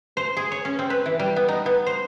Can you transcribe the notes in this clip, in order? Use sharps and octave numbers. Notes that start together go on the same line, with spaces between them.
C5
G#4
C#5
C#4
C4
B4
E3
G3
B3
D#4
B3
C5